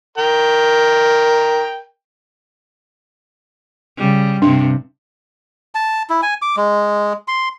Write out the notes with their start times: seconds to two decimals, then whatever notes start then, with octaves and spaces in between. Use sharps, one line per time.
0.18 A#4 G5
3.98 C#3 G3
4.42 G2 C3 D4
5.75 A5
6.10 E4
6.22 G#5
6.42 D6
6.57 G#3
7.28 C6